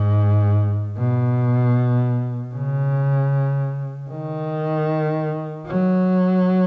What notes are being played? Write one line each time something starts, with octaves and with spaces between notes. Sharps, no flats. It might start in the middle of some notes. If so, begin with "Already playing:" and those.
Already playing: G#2
B2
C#3
D#3
F#3